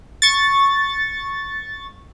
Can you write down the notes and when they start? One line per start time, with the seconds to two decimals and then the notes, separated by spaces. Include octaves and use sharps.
0.22 C#6 A6